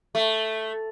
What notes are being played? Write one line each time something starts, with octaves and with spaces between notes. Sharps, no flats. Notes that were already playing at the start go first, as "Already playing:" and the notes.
A3